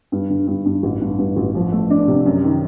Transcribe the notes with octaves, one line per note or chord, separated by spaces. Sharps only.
G2
D3
G2
G2
A1
G2
G2
A1
F3
A3
D4
C3
F#2
D#3